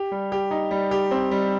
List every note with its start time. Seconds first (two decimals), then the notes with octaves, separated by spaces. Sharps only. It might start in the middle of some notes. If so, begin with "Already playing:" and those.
Already playing: G4
0.12 G3
0.32 G4
0.51 D#4
0.71 G3
0.91 G4
1.11 C4
1.31 G3